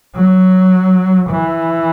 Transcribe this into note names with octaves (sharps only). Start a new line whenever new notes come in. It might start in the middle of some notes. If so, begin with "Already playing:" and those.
F#3
E3